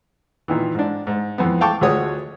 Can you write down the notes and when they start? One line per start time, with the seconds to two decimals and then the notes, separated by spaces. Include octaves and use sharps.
0.48 A#2 D#3 E3
0.75 G#2 D4
1.07 G#2
1.38 F2 E3 B3
1.61 F5 G5 A5 C#6 D6
1.81 D2 G#3 F4 F#4 C#5 D#6